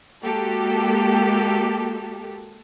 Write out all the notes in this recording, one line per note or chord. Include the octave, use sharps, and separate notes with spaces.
G#3 A#3 F#4 G4 A4